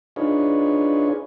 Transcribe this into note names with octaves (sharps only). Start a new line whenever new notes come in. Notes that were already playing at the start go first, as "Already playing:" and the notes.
D4 D#4 F4 G#4 B4 C#5